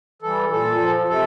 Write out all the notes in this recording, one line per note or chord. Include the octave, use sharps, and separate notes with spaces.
E3 G3 A4
A#2 A4
F3
C3 A4